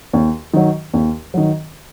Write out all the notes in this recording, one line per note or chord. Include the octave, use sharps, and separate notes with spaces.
D#2
D#3 F#3
D#2
D#3 F#3